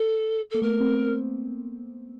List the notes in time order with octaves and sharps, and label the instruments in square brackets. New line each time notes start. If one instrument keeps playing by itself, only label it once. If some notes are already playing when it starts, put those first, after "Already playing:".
Already playing: [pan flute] A4
[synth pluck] A#3 [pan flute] A4
[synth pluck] A3 B3 [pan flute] A#4
[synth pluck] A#3 C4